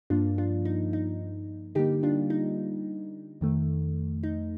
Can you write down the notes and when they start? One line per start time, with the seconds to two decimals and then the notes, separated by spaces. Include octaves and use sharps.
0.10 G2 F3 A#3 D4 F4
0.38 D4 F4
0.65 D#4
0.93 D#4
1.75 D3 G3 A#3 D#4 G4
2.03 D4 F4
2.30 D#4
3.41 F2 D#3 A3
4.23 D#4